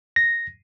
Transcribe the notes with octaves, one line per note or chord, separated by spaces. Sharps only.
A#6